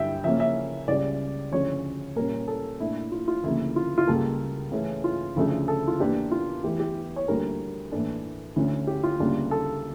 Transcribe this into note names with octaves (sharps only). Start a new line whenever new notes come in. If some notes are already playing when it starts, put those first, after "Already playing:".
Already playing: G2 D3 G3 E5 G5
C#3 F3 A#3 C#4 E5
E5
C#2 C#3 G3 D5
D2 C#3 F3 C#4 C#5
A#2 G3 C#4 A#4
A4
A#2 A3 D4 E4
F4
F4
D2 C#3 F3 A#3 E4
F4
F4
C#2 C#3 G3 A#3 A4
C#3 E3 A3 C#4
F4
D2 C#3 F3 A3 D4
A4
F4
E2 E3 A#3 D4 G4
F4
E2 E3 A3 G4
G4
C#5
D2 D3 G3 A#3 A#4
A2 E3 A#3 D4 A4
D2 D3 A3 C#4
G4
F4
D2 C#3 G3 A#3 D4
A4